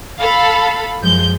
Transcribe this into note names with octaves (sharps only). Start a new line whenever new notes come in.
A4 F5 B5
F#2 F3 G#3 G6